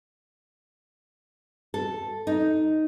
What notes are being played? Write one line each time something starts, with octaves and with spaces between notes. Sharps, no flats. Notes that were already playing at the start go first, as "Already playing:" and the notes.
A4
D#4